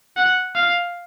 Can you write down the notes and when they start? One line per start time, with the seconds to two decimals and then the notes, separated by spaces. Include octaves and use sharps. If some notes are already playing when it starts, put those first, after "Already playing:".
0.17 F#5
0.55 F5